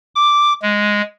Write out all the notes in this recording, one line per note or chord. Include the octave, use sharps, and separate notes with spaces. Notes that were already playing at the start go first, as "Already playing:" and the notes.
D6
G#3